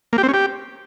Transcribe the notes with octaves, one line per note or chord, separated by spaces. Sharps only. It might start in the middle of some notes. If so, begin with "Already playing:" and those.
A#3
G4
C4
C#4
G4